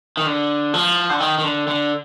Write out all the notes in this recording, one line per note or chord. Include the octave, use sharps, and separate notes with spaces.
D#3
D3
F3
D3
D#3
D#3
D3
D3